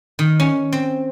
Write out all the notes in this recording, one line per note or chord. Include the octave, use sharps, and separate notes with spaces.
D#3
C#4
C4